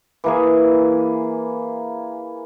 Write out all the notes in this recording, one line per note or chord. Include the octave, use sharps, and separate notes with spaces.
E3 A#3 G#4